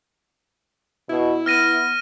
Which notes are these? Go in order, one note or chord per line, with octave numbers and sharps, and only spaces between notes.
B2 E4
B3 F6 A#6 D#7